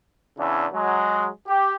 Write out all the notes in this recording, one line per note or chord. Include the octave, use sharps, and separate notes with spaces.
E2 C#3 D4 E4
F#3 G#3
G4